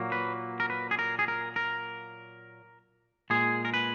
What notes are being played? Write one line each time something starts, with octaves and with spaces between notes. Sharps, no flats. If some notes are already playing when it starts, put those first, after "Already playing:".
Already playing: A#2 F#3 A#3
B4
A#4
B4
G#4
A#4
G#4
A#4
A#4
A#2 G#3 G#4
A#4
B4